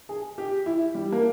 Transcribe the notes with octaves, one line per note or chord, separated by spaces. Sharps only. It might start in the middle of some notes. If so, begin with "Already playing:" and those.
G#4
G4
E4
G3
A#3